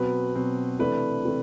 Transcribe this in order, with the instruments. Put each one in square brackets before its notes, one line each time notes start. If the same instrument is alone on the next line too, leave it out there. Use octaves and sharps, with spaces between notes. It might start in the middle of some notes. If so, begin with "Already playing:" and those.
Already playing: [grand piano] B2 F#3 C4 B4
B2 F#3 C4
C3 E3 A3 D4 B4
C3 E3 A3